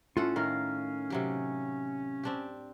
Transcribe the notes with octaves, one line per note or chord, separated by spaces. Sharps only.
A2 C#4 F4 A4 F#5
A2 D#3 A#4 F5 F6
C3 F#3 G4
C4 D4 G4